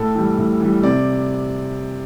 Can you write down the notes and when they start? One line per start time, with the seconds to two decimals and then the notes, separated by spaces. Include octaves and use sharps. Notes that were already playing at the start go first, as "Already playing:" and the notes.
Already playing: A2 A4
0.15 E3 G3
0.38 A2
0.60 E3 G3
0.83 C3 D5